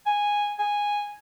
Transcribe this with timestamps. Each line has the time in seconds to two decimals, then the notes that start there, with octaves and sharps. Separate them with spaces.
0.06 G#5
0.59 G#5